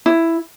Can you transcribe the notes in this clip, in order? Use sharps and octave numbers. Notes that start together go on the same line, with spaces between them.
E4